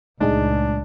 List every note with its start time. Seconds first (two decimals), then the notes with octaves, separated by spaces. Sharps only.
0.21 C#2 A#2 G#3 A3 D4 D#4 G#4